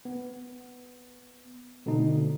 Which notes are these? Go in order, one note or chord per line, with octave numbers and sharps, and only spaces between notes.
B3
B2 D3 A3 C4 D#4